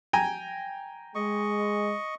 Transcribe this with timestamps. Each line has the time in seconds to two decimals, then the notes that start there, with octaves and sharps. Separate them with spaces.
0.13 G5 G#5 A#5
1.15 G#3 D#5 C#6